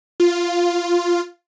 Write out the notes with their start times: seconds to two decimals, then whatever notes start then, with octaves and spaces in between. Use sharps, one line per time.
0.20 F4